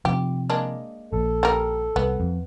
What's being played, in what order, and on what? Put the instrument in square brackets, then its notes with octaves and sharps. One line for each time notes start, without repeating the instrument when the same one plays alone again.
[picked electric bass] C3 F3 [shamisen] G4
[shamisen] G#3 A#3 D4
[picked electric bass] A#1 [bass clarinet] A4
[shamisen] G3 A#4
[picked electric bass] C2 [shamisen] B3
[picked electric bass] F2